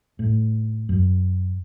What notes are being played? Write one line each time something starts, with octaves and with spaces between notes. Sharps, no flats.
A2
F#2